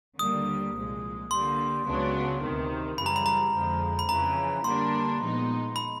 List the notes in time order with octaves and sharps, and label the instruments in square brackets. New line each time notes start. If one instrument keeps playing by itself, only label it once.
[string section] D#2 D3 G3 A#3 [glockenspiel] D#6
[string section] C2 A#2 F3 G#3
[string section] D3 G3 A#3 [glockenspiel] C6
[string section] C#2 C#3 F#3 B3 D4
D2 C3 D#3
[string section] F#2 C#3 E3 G3 [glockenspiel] B5
[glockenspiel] A#5
B5
A#5
[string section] F2 D3 F3 G#3
[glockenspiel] B5
[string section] F2 C#3 E3 [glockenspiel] A#5
[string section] D3 G3 A#3 D4 [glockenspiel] C6
[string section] A#2 F3 G#3 B3 D#4
[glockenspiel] B5